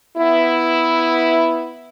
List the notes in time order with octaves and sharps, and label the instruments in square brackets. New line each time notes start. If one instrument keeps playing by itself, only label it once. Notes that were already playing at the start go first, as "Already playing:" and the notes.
[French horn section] B3 E4